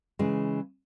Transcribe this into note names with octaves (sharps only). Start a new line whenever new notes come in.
C#3 E3 G#3